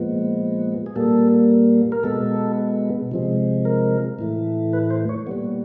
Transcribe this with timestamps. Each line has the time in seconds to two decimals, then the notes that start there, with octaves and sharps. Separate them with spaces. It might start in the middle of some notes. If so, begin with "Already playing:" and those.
Already playing: A#2 F3 G#3 B3
0.86 G#4
0.96 A#2 G3 A#3 A4
1.92 A#4
2.03 B2 G#3 B3 A4
3.12 C3 F3 G#3
3.65 A#4
4.19 A2 E3 A3
4.73 B4
4.90 C5
5.09 C#5
5.27 A#2 G3 B3